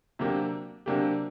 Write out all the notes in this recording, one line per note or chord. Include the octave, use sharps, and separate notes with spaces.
C3 F#3 A#3 D4 G4
C3 F#3 A#3 D4 G4